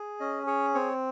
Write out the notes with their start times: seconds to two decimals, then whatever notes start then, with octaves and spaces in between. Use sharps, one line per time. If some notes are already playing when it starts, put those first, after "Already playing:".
Already playing: G#4
0.20 C#4 D#5
0.47 G#4 C#5
0.75 C4 C#5